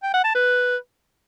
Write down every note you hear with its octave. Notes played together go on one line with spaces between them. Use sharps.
G5
F#5
A5
B4